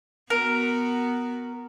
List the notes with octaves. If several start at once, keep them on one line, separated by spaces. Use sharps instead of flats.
B3 F#4 A#4